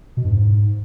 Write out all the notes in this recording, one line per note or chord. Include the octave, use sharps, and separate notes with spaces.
B2
G2
G#2